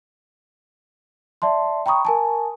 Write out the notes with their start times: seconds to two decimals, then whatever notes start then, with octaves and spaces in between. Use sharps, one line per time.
1.42 D5 E5 A5 C6
1.86 G5 A#5 B5 C#6 D#6
2.05 A#4 G#5 A5